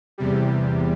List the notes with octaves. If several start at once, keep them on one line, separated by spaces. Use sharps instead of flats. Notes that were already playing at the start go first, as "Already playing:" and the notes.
E2 C3 G3